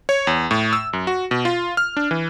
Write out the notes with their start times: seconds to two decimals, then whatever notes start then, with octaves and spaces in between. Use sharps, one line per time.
0.09 C#5
0.27 E2
0.51 A2
0.73 E6
0.93 F#2
1.07 F#4
1.31 B2
1.45 F4
1.77 F6
1.97 D4
2.11 E3